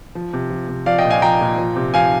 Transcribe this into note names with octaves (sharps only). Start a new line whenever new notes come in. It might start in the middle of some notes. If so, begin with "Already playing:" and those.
F3
C3
F3
C3
F3 D5 F5
D#5 G5
A#2
F5 G#5
F3 G5 A#5
A#2
F3
C3
F3 F5 G#5